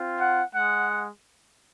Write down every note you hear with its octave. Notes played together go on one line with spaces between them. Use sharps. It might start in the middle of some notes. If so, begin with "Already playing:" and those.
Already playing: C4 F4
F#5
G#3 F#5